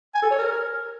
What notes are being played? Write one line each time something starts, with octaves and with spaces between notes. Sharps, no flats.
G#5
A4
C#5
A#4